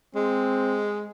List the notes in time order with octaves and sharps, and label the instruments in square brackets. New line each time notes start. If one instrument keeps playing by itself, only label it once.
[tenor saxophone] G#3 [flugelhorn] C4